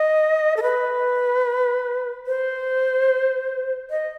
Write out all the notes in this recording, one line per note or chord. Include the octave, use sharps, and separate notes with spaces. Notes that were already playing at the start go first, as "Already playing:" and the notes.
Already playing: D#5
A4
B4
C5
D#5